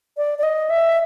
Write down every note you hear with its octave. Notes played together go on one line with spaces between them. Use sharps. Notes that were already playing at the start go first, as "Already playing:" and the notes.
D5
D5
D#5
E5